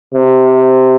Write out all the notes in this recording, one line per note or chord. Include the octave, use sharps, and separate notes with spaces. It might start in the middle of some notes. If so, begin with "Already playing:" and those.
C3